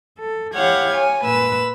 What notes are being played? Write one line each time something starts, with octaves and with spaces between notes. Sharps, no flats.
A4
E4 G4 C#5 F5 F#5 G#6
C#5 G#5
A#2 B4 E6